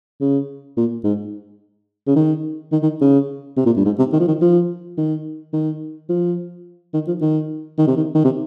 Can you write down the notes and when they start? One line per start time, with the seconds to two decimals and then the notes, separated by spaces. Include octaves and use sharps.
0.21 C#3
0.77 A#2
1.04 G#2
2.07 C#3
2.16 D#3
2.72 D#3
2.82 D#3
3.01 C#3
3.57 C3
3.66 A#2
3.76 G2
3.85 G#2
3.99 C3
4.13 D#3
4.20 F3
4.28 D#3
4.42 F3
4.97 D#3
5.53 D#3
6.09 F3
6.94 D#3
7.07 F3
7.21 D#3
7.78 D#3
7.87 C3
7.97 D#3
8.15 D#3
8.24 C3